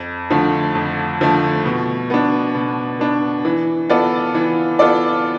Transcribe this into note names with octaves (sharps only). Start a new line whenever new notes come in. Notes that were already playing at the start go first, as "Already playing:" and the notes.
Already playing: F2
D3 F3 A3
F2
D3 F3 A3
B2
B3 D4
B2
B3 D4
E3
B3 F4 A4 D5
E3
B3 F4 A4 D5